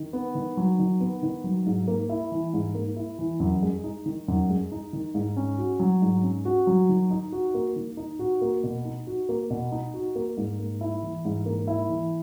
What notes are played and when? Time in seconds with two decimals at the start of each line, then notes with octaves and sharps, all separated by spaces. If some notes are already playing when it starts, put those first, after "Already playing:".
Already playing: D#3
0.13 B3
0.35 D#3
0.57 F#3
0.79 D#3
1.00 B3
1.23 D#3
1.44 F#3
1.67 G#2
1.88 A#3
2.09 E4
2.32 E3
2.54 G#2
2.75 A#3
2.96 E4
3.19 E3
3.40 F#2
3.63 G#3
3.84 D#4
4.06 D#3
4.28 F#2
4.50 G#3
4.72 D#4
4.93 D#3
5.15 G#2
5.37 C#4
5.58 F#4
5.80 F#3
6.02 G#2
6.23 C#4
6.45 F#4
6.67 F#3
6.89 D#3
7.11 D#4
7.32 F#4
7.55 A#3
7.76 D#3
7.97 D#4
8.19 F#4
8.42 A#3
8.63 B2
8.85 D#4
9.07 F#4
9.29 A#3
9.50 B2
9.72 D#4
9.94 F#4
10.16 A#3
10.37 G#2
10.59 A#3
10.81 E4
11.03 E3
11.25 G#2
11.46 A#3
11.67 E4
11.89 E3